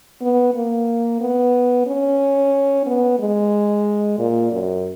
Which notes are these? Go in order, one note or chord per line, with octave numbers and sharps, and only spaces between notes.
B3
A#3
B3
C#4
B3
G#3
A#2
F#2